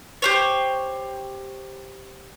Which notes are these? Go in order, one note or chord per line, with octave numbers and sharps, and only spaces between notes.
G4 C5 C#5